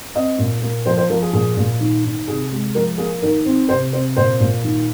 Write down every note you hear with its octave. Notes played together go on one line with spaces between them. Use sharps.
C4 D#5
A#2
A#3
F3 C5
C5
F3 A#4
G#4
A#2 G#4
A#2
D#3
D#3
C3 G#4
G#3
F3 A#4
A#3 G#4
D#3 A#4
C4
C3 C5
C4 C5
A#2 C5
A#2
D#3